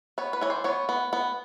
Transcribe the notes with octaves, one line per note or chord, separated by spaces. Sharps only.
B3 C#5
B4
E3 C#5
C5
B3 C#5
B3
B3